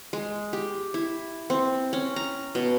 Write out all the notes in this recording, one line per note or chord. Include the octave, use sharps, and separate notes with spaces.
G#3
G4
E4
C4
C#4
A#5
B2